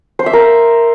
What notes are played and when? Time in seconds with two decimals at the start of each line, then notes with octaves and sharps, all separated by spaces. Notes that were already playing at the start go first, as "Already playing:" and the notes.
0.19 C5
0.26 E5
0.33 A#4